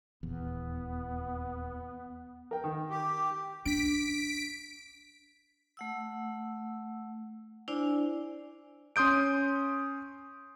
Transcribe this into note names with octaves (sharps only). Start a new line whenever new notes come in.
D#1 E2 B3
A#4 G5
D#3
G4
D4 B6 D7
A3 F#5 E6
D4 E4 C5 D5 G#5
C#4 C6 D#6 G6 D7